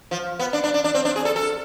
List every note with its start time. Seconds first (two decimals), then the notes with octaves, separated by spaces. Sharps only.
0.11 F3
0.39 B3
0.53 D4
0.64 D4
0.74 D4
0.84 D4
0.94 C4
1.05 D4
1.16 G#4
1.25 A4
1.36 A4